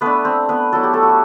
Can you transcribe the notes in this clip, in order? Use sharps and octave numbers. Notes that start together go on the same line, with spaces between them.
A3 B3 D4 B4
C4 C5
B3 B4
F#3 B3 E4 A4
G4
A3 A4
F#4
G4